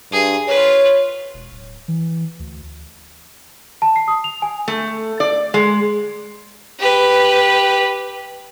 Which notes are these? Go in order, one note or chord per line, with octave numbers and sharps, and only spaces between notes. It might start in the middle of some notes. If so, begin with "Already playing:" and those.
G2 G#4
F4 B4 C#5
E1
D1
E3
D2
A5
C7
D#6
F7
G#5
A3
D5
G#3
G4 B4